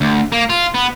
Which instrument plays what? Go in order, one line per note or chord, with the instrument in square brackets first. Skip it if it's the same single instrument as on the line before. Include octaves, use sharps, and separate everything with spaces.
[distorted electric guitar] D2
A#3
F4
B3